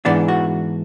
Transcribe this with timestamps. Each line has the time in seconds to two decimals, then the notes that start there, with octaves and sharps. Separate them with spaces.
0.05 G#2 E3 B3 D4 D5
0.28 F#4